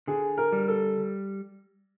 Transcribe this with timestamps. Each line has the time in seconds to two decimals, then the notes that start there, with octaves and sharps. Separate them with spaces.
0.08 D3 G#4
0.38 A#4
0.52 G3
0.68 A4